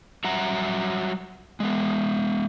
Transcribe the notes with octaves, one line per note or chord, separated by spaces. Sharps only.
F#3 G3 E5 F#5 A#5
G#3 B3